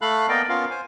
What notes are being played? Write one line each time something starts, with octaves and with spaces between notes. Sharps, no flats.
A3 A4 F5 B5 F#6
A#3 B3 A#4 D5 D#5 G5
B3 C#4 F4 A#4 F5
C5 G#5